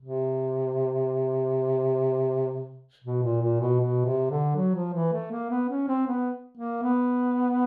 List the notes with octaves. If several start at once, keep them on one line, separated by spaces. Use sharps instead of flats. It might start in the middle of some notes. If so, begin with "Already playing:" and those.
C3
B2
A#2
A#2
B2
B2
C3
D3
F#3
F3
E3
A3
A#3
B3
C#4
C4
B3
A#3
B3